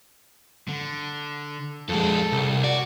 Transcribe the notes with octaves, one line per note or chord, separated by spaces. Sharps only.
D3
F2 G#3 A4
C2
F#4 D5